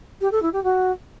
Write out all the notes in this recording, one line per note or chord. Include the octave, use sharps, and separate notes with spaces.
G4
A4
E4
G4
F#4